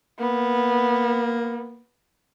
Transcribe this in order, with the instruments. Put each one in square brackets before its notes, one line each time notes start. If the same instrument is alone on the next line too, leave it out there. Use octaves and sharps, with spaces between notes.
[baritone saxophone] A#3 [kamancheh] B3